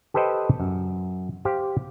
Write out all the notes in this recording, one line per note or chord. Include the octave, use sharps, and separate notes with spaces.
G4 A4 B4 C5 D#5 G5
F#2
G4 C5 F5